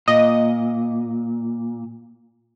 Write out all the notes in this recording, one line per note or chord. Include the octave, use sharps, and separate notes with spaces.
A#2 D#5